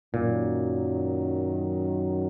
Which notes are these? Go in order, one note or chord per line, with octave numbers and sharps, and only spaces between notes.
F#2 A#2 D#3 F#3